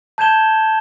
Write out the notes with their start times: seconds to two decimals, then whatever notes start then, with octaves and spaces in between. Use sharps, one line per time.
0.18 A5 G6 G#6 E7 G7